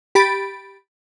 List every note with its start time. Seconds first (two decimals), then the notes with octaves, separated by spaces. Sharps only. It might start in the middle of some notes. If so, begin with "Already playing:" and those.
0.15 G4 B5 A6 D7